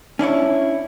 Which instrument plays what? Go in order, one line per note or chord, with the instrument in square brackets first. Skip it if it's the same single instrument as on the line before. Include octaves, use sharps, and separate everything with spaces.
[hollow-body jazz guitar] C#4 D4 E4 C#5